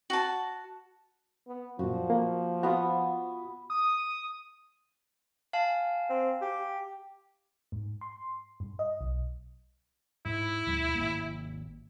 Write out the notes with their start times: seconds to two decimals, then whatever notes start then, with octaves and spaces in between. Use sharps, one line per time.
0.10 F#4 A5
1.47 B3
1.79 F#2 A#2 F3 F#4
2.10 A#3
2.63 B3 F4 F#4 E5 D#6
3.70 D#6
5.53 F5 G#5 A5
6.10 C4
6.41 G4
7.72 G#2
8.01 C6
8.60 G2
8.79 D#5
9.01 B1
10.25 G#2 E4
10.66 D2 G2 B2
10.95 G#1 A#3